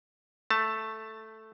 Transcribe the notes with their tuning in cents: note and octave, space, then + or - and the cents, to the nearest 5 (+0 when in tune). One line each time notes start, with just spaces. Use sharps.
A3 +0 A5 +15